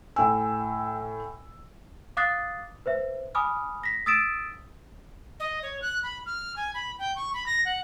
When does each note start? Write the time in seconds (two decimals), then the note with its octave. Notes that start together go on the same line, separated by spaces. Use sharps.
0.16 A2 G5 G#5 E6
2.17 F5 D6 D#6 F#6 A6 C7
2.86 B4 C5 E5
3.35 G#5 B5 D6 D#6 F6
3.83 A#6 B6
4.06 D#6 E6 A6 B6 D7 E7
5.40 D#5
5.63 C#5
5.82 F#6
6.03 B5
6.26 F6
6.56 G#5
6.74 B5
6.99 G5
7.16 C#6
7.34 B5
7.47 A#6
7.65 F#5